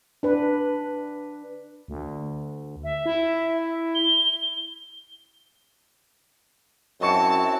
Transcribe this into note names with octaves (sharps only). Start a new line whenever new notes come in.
D4 B4
D2
E5
E4
G7
F#2 C4 E4 F#4 D#5 A5 C#6 C#7